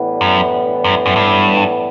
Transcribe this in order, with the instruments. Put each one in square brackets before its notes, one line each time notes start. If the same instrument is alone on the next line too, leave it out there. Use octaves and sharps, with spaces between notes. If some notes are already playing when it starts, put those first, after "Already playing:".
Already playing: [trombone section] A2 E3 G3 B3 D4
[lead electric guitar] F#2
F#2
F#2
G2